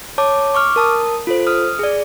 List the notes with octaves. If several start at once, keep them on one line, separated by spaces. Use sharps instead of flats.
C#5 A5 D6
C#6 D6 F6
A#4 A5 D#6
F4 A4 C5
D#6 F6
G#4 D5